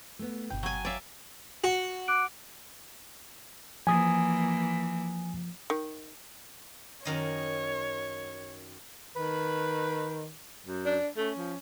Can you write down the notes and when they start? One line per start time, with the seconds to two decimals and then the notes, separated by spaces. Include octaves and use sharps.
0.19 A3 B3
0.50 G1 B2 G5
0.63 F#3 G#5
0.85 C#5 D5 E5 F5
1.64 F#4
2.08 D6 F#6 D7
3.87 E3 F3 A#3 G#5 D#6
5.70 D#3
7.05 F#2 D#3 C#5 D#5
9.16 D#3 B4
10.66 F#2
10.85 D4
11.17 A3 C#4
11.38 F3